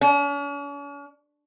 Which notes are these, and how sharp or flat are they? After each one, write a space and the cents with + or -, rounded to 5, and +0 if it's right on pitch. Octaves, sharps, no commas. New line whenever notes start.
C#4 +45